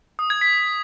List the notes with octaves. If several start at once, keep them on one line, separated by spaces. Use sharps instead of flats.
D#6
G#6
B6